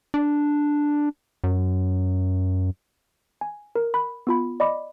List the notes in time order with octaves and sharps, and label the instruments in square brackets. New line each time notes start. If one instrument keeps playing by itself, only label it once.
[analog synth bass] D4
F#2
[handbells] G#5
A#4
B5 F#6
B3 F4 B5
D5 D#5 B5 D6